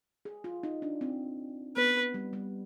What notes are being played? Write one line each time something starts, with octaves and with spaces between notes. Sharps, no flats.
G#4
F4
D#4
D4
C4
B3 B4
G3
G3